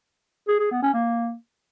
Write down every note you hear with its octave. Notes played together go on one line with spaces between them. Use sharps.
G#4
G#4
B3
C#4
A#3